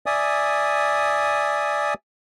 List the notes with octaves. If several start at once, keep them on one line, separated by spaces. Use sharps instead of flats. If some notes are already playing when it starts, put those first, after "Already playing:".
D5 E5 G#5 D#6